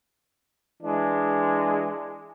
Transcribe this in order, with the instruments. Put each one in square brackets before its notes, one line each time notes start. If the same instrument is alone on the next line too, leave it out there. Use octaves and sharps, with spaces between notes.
[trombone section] E3 G#3 D4